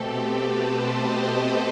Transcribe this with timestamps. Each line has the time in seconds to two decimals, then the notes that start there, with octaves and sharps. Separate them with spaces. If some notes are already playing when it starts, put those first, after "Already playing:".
Already playing: B2 A3 C4 G4 A4
0.22 B4
0.57 C5
0.93 D#5